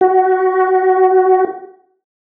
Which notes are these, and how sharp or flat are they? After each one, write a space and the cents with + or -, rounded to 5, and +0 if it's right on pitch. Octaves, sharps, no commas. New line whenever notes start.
F#4 +15